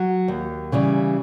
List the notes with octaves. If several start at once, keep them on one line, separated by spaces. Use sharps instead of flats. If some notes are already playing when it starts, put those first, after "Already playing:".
Already playing: F#3
D#2
C#3 E3 G3